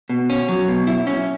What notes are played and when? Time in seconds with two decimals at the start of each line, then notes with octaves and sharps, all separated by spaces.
0.09 B2
0.30 C#4
0.49 F#3
0.68 B2
0.87 E4
1.07 C#4